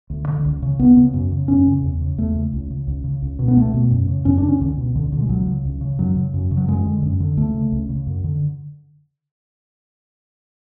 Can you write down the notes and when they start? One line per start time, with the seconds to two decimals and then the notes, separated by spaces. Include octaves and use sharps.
0.10 D2
0.28 D3
0.45 C#2
0.62 C#3
0.79 C#2 B3
0.96 C#3
1.14 F#2
1.31 C#3
1.48 F#2 C#4
1.67 C#3
1.83 E2
2.01 C#3
2.18 E2 A3
2.35 C#3
2.53 C#2
2.70 C#3
2.87 C#2
3.04 C#3
3.22 C#2
3.39 B2
3.48 B3
3.56 C#2 A3
3.74 B2
3.90 F#2
4.08 C#3
4.25 F#2 C#4
4.38 D4
4.43 C#3
4.48 C#4
4.60 C#2 D3
4.77 B2
4.95 C#2 D3
5.12 B2 D3
5.22 G#3
5.29 C#2 F#3
5.47 C#3
5.65 C#2
5.81 C#3
5.98 F#2 F#3
6.16 C#3
6.34 F#2
6.51 C#3
6.57 F#3
6.68 F#2 G#3
6.85 D3
7.03 F#2
7.20 D3
7.37 C#2 A3
7.55 C#3
7.72 C#2
7.89 C#3
8.06 F#2
8.24 D3